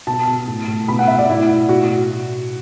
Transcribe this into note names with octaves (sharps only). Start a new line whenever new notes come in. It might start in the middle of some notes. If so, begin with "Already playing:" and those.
B2 A5
B2
A2
A2
B2 B5
F#5
B2 E5
D5
A2 E4
A2
B2 F#4